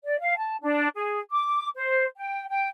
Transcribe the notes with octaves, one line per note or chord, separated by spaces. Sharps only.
D5
F5
A5
D4
G#4
D6
C5
G5
G5